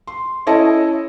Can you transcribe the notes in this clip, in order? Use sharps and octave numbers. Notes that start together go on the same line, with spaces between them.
C6
C#4 E4 A4 D#5 A5